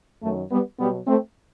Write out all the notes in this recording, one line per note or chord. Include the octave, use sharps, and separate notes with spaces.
F#2 D#3 F#3 A3
G3 B3
B2 F#3 G3 B3
A3 C4